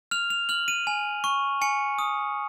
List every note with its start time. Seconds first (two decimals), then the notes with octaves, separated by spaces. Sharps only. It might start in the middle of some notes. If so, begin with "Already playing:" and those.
0.11 F6 F7
0.30 F7
0.49 F6 F#7
0.68 D#7
0.87 G#5
1.24 C#6
1.61 G#5 C#7
1.99 D#6